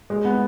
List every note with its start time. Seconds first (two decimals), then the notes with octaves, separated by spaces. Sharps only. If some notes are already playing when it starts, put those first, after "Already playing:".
0.10 G#3
0.25 B3